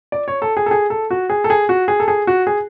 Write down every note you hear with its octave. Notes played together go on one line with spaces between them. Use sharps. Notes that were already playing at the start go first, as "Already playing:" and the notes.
D5
C#5
A4
G#4
A4
G#4
A4
F#4
G#4
A4
G#4
F#4
G#4
A4
G#4
F#4
G#4